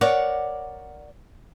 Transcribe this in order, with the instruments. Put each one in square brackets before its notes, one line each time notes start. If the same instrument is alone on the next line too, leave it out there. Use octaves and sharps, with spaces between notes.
[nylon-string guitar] A#4 C#5 D5 F#5